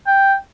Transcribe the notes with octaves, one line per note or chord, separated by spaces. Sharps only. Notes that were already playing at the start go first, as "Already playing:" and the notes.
G5